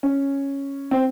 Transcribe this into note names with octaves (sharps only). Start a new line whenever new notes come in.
C#4
C4